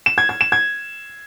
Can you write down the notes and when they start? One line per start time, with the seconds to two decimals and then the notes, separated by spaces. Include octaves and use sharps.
0.06 E7
0.18 G#6
0.29 G#6
0.41 E7
0.52 G#6